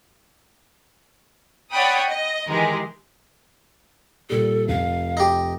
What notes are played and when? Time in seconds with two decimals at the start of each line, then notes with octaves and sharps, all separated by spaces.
1.71 C#5 D5 F#5 G5 B5 D#6
2.08 D#5
2.49 D#3 E3 G#3 G4 A#4
4.30 A#2 G3 A4
4.68 F1 F5
5.17 D#4 G4